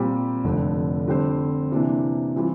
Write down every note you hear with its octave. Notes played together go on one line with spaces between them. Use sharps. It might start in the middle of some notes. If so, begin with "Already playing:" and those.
Already playing: A#2 G3 C4 G4
F1 F2 D3
D3 G3 C4 G4 C5
C3 E3 A#3 D4
E3 G3 C4 F4